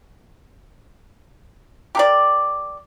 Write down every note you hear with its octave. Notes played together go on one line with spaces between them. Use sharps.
G4 A#4 D5